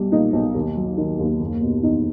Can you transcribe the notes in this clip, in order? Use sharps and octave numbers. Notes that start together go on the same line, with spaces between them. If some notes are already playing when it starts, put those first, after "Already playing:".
Already playing: B1 G3
A#2 D#4
B1
D#2
F#3
D#3
D#2
F#1
B2
E2 D#4